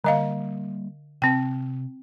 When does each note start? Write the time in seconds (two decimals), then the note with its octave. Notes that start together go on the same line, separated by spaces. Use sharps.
0.04 D3 G3 A#3 D#5 F5
1.22 C3 C4 G5